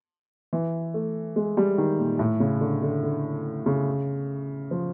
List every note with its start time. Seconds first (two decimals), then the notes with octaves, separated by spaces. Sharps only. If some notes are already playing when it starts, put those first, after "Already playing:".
0.53 E3
0.94 A3
1.36 G#3
1.57 G3
1.78 D#3
1.98 A#2
2.19 A2
2.40 C#3
2.61 D3
2.82 D3
3.03 D3
3.66 C#3
4.71 F3